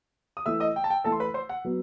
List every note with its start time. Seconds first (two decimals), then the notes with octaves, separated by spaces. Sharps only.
0.37 D#6
0.46 E3 A3 E4 E5 E6
0.60 D#5 D#6
0.76 G5
0.84 A5
0.90 G5
1.04 E3 A3 E4 A4 A5
1.12 C6
1.20 B4 B5
1.34 C5 C6
1.49 F#5
1.65 F#3 B3